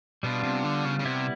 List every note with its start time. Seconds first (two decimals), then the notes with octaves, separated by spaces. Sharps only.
0.23 B2 G3 B3 D4 F4
0.43 C3
0.64 D3
0.85 C#3
0.99 C#3
1.04 C3 G3 B3 E4